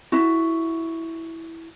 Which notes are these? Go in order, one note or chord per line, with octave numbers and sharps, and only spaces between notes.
E4 F#4